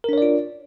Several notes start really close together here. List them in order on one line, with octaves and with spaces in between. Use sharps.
A#4 D4 C#5 D5 F4